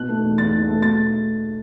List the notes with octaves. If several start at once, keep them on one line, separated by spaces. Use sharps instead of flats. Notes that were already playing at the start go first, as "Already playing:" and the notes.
Already playing: B2 F#6
A3
E2
E2 A6
B2
A3
B2 A6